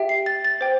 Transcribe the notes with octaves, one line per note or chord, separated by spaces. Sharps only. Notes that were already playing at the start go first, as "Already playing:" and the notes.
Already playing: G4 E5 G5
C7
A6
A6
C5 G5